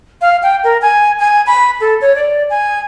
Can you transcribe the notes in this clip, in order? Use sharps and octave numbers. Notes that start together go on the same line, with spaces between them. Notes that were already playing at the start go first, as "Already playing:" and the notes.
F5
G5
A#4
G#5
G#5
B5
A4
C#5
D5
G#5